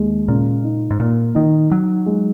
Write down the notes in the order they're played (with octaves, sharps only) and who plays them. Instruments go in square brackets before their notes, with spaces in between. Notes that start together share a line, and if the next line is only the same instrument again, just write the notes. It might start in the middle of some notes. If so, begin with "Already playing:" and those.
Already playing: [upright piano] D#2 G#3
[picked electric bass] A#2 [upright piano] C#3
[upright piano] D#4
[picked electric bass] G#2
[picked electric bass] A#2 [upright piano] A#3
[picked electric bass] D#3 [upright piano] D#4
[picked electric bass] F#3 [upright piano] D#4
[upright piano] G#3